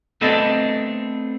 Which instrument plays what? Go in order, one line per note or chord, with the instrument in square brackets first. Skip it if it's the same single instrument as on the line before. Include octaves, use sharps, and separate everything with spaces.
[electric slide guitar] A3 B3 C4 D4 A4 D#5